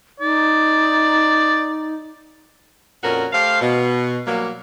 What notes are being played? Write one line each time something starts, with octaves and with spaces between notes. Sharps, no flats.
D#4 D5
F2 A#2 C#4 F#4 A#4
A3 G4 C5 F5
B2
F#3 G3 A#3